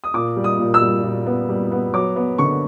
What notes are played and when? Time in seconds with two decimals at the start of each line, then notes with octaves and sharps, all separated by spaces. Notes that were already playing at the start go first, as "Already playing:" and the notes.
0.04 D#6
0.14 A#2 D6
0.37 G3
0.44 D#6
0.59 A#2
0.74 E6
0.81 G3
1.03 A#2
1.26 B3
1.49 G3
1.71 B3
1.94 F#3 D6
2.16 B3
2.38 D3 C#6